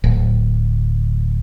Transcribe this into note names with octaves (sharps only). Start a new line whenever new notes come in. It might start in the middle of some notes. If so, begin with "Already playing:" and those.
D1